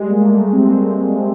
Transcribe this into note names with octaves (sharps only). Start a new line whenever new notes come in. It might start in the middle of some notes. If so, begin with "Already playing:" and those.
Already playing: G3 G#3
A#3
A3
C4